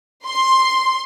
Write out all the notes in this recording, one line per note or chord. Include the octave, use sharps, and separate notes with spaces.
C6